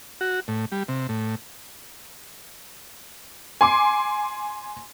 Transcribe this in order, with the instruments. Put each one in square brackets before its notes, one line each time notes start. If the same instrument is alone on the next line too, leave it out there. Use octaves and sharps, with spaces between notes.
[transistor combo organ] F#4
A2
G3
C3
A2
[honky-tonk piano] G#5 C6 D6